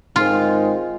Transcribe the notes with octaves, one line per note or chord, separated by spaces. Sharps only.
G#2 D#3 G#3 C4 F4